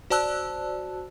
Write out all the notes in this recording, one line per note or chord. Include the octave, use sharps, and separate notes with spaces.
F#4 C5 D5 A5 E6 F#6